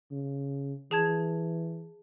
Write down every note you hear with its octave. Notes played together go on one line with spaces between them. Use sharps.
C#3
E3 G#4 A5 G#6